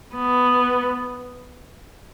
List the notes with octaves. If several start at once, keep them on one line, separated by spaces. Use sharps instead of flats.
B3